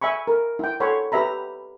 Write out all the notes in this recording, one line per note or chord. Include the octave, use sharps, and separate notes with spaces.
E5 G#5 B5 C#6
A#4
E4 G5
A4 C#5 F#5 B5 C6
G4 B4 E5 A#5 B5